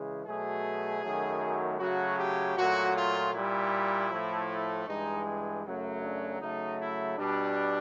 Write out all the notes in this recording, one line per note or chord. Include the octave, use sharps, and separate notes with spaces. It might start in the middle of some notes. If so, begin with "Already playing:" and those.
Already playing: C#3 E3 G#3
B2 F#3 A3 G#4
F#2 D#3 F#3 A3
C#3 F#3 A3 F#4
G4
A#2 F#3 A3 F#4
F4
A#2 G3 E4
A2 F3 A3
G2 E3 G#3 D#4
F#2 C#3 F#3 A3
D4
C#3 F#3 A3 D#4
E4
B2 G3 D4